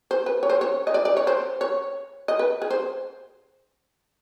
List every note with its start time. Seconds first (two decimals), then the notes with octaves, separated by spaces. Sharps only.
0.11 C5
0.26 B4
0.43 C#5
0.50 C5
0.61 C#5
0.87 D#5
0.94 D5
1.05 D5
1.17 C#5
1.27 C5
1.61 C#5
2.28 D#5
2.39 B4
2.62 G#4
2.71 C5